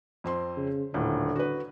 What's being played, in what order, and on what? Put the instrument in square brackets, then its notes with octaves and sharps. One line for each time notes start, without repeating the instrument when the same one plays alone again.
[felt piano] F2 C4 C6
[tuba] C#3
[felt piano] D#1 A2 [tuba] D3
[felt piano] F#4 B4